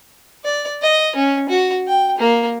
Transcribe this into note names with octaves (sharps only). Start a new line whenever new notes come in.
D5
D#5
C#4
F#4
G5
A#3